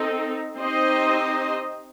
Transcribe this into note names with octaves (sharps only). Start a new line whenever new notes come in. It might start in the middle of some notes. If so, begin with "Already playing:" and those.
Already playing: C4 D#4 A4
C4 D#4 G4 C5 D#5